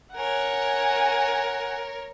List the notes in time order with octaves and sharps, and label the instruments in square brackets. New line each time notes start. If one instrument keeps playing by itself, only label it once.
[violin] A#4 C#5 [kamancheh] F#5 G#5